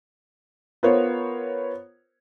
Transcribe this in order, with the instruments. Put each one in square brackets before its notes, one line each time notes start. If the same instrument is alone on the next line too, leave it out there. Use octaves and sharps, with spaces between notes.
[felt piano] B3 F4 A#4 C5 C#5